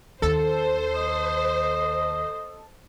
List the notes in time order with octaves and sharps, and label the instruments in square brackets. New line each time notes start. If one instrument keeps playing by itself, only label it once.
[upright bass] D#2 [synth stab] A4 [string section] C5
[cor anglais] D#5